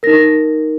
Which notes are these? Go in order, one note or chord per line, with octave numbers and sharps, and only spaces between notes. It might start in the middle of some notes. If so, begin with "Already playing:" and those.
D#4 A#4 A#6